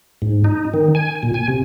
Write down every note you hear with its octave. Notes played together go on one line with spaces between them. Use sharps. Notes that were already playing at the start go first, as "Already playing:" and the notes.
G#2
D#4
D#3
G#5
A#2
G#5
C3